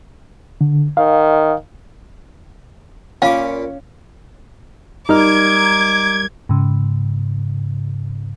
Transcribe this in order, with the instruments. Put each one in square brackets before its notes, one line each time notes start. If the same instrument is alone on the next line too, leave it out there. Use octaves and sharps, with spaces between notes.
[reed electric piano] D3
[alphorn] D#3 [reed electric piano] F5
[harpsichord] A#2 B5 D6 [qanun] C#4 [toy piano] F5
[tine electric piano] G3 A#4 F6 [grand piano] D#4 [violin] D6 [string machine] G#6
[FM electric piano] G#2 C#3